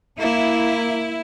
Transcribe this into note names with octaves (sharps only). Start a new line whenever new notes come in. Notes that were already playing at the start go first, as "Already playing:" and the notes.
A#3 E4